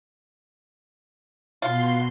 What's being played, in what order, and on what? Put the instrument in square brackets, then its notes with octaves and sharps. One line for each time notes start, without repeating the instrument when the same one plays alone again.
[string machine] B2 C6 [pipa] F4